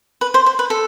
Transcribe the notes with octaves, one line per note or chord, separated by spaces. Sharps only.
B4
C5
C5
B4
A4